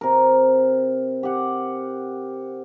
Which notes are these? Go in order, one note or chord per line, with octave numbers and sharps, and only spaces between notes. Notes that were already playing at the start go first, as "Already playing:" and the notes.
C3 A#4
G4 F#5